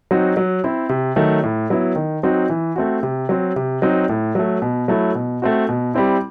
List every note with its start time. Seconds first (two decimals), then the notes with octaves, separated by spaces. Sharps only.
0.11 F#3 C4 D#4 F#4
0.37 F#3
0.64 C4 E4
0.89 C3
1.16 D#3 F#3 A3
1.43 A2
1.70 F#3 B3 E4
1.96 D#3
2.23 F#3 C4 D#4 F#4
2.49 E3
2.76 A3 C4 F#4
3.03 C3
3.29 F#3 C4
3.56 C3
3.82 F#3 C4 D#4
4.09 A2
4.35 F#3 A3
4.62 B2
4.88 F#3 A3 E4
5.15 B2
5.42 A3 C4 F#4
5.69 B2
5.94 G3 C4 E4